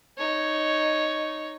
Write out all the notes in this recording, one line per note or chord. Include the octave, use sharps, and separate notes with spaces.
D#4 C#5